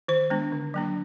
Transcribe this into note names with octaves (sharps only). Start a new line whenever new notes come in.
D#3 C5
G#3 B3 D4
D3
F#3 A#3 D4